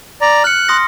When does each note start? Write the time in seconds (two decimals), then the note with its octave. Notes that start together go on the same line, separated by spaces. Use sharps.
0.21 D5 A#5
0.44 F6 F#6 C#7
0.69 C6 D#6 A#6